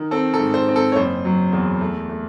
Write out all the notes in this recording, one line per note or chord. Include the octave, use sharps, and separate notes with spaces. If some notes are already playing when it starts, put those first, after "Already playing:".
Already playing: D#3
C4 A4
A4
G#2
C5
C4
A4
C#5
F#1 C5
F#3
E2
A3
A3